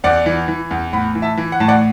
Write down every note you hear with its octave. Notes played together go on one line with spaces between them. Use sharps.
E2 D5 F#5
E3
E3
E2
A2 F#5 B5
E3
E5 A5
E3
F#5
A2 A5
D5 F#5